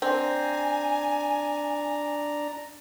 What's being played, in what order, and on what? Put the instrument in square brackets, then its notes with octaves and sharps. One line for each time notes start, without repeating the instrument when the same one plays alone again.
[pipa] C4 [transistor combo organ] D4 A#5 [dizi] G#5